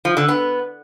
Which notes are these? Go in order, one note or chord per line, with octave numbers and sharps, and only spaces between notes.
F3
D3
B3